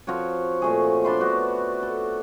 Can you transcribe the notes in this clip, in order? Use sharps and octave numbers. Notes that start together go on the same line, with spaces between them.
F3 C4 F#4 C#5
A#2 A3 G#4
D4 A5 B5 C6
B3 D4 F#4
A4